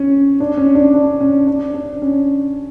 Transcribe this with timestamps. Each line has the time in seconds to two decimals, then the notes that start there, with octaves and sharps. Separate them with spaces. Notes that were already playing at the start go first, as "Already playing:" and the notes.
Already playing: C#4
0.40 D4
0.57 C#4
0.75 D4
0.94 D4
1.21 C#4
1.47 D4
1.74 D4
2.02 C#4